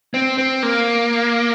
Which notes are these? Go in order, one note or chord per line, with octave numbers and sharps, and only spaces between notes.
C4
C4
A#3